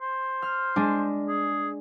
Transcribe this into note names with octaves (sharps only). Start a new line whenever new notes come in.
C5
F6
G#3 D4
G#4